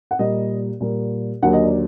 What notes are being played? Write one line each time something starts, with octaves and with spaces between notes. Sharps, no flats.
F#5
A#2 G3 A#3 D#5
A#2 G3 A#3
D#2 D3 F#3 A#3 F#5
D#5
D5